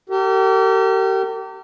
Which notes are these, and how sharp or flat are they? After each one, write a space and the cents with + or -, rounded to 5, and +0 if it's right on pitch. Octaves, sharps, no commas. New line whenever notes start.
G4 -35 A#4 -45